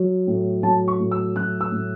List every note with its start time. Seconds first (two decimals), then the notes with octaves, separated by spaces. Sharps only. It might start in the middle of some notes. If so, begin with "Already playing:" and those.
Already playing: F#3
0.27 A2
0.63 F#3 A5
0.88 C#6
1.00 A2
1.11 E6
1.36 F#3 F#6
1.61 E6
1.72 A2